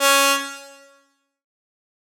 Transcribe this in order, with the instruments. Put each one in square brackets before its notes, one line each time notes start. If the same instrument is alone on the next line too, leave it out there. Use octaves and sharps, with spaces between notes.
[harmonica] C#4